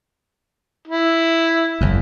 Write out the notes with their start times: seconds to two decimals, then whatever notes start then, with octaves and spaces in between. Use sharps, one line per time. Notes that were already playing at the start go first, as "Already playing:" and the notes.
0.88 E4
1.81 F#1 E2